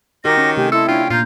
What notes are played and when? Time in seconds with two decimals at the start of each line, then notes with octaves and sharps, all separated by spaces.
0.25 D#3 F#4 G4 A#4 G5 D6 A#6
0.38 C#4
0.57 C3 A3 G4 G#5
0.72 E4 A4 D#5 A5 C6
0.88 C#4 D4 F4 G5
1.10 A#2 F4 A#5 G6